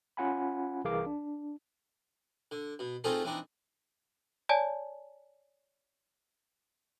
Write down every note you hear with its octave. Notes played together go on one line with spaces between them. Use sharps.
C#4 F4 F#5 G#5 B5
C2 E3 G#4 A#4 F5 D6
D4
D3
B2
A3 C4 D#4 F4 G#4 A4
E3 C4 D4 D#4
C#5 D5 G#5 A5